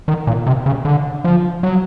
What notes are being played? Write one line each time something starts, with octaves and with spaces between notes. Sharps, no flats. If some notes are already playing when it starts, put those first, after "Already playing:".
D#3
A#2
C3
C#3
D3
F3
F#3